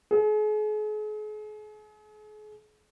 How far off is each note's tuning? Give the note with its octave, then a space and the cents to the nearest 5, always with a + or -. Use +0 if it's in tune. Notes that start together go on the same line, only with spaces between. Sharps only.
G#4 +40